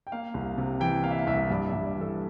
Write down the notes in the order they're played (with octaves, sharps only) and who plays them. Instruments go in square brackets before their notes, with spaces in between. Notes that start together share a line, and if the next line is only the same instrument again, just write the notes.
[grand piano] G5
A#3 F5
C2
C3
E3 G5
A#3 F5
E5
F5
C2 E5
G2 D5
E5
G2
D5
E3
A4